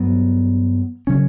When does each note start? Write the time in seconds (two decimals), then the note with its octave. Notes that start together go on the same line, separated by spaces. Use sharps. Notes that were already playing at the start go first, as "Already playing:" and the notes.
Already playing: G2 F#3 B3
1.07 C#3 F#3 C#4